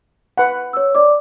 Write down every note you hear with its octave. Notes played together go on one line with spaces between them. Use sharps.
B4 F#5
C#5 E6
D5 D6